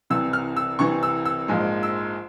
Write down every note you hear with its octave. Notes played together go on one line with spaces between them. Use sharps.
C2 C3 E3 E6
F6
E6
C2 C3 E3 C#6
E6
E6
A#1 G#2 F3 G#3
E6